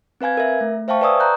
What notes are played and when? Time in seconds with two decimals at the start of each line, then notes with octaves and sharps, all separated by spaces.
0.21 C4 B4 F5 G#5 G#6
0.37 A#4 E5
0.61 A3
0.88 C5 E5 F5 G5 A5 C#6
1.01 B4 D5 G#5 C#6 D#6 E6
1.20 A#5 F#6 G6